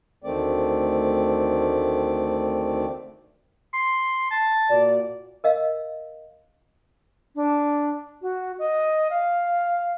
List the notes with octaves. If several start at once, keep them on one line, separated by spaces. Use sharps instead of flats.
D2 D#3 A3 C4 D5
C6
A5
A#2 F#4 D5
A#4 D#5 F5
D4
F#4
D#5
F5